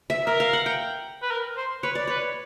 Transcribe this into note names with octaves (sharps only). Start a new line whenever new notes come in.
E5
A#4 E5
F5
F#5
G5
B4
A#4
C5
B4 C#5
D5
B4 C#5